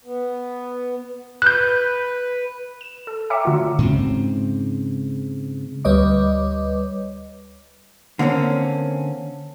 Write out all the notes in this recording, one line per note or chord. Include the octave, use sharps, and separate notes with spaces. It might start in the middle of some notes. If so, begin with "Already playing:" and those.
B3
B4 F#6 G6
E7
A4
C#5 E5 G5 A#5 D6 C#7
D3 A3 F4 F#4
G#2 C#3 C4
D2 G3 B4 C#5 D#5 D6
D3 A#3 C4 C#4